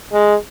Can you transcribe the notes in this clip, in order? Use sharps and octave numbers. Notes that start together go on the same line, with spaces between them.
G#3